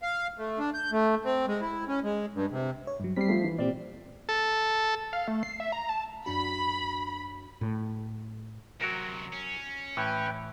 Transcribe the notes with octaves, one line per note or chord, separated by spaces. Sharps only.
F5
A3
D4
G6
A3
C4
G#3
E4
C#4
G#3
G2
C3
C#5
G2 F#3
G3 C4 B6 C7
F3 A3
E3
A#2 C4 G4 D5
A4
F5
A3
C7
E5
A#5
A5
F#2 D4 F#4 B5
A2
F#2 C3 F#3 F#4 A#4
C#4
A2 E3 B4 G5